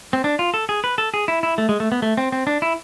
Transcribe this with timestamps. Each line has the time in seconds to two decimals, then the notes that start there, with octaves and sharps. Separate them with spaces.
0.13 C4
0.24 D4
0.39 F4
0.54 A4
0.69 G#4
0.84 B4
0.98 A4
1.14 G#4
1.28 E4
1.43 E4
1.58 A3
1.69 G#3
1.80 A3
1.92 B3
2.02 A3
2.17 C4
2.32 C4
2.47 D4
2.62 E4